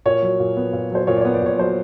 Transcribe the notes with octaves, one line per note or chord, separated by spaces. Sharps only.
A#2 C#5
F#3
A#2
B3
A#2
F#3 C5
A#2 C#5
D5
B3 C#5
D5
A#2 C#5
F#3 C5